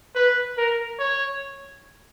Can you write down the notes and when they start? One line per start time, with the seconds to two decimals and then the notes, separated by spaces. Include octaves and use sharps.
0.15 B4
0.57 A#4
0.99 C#5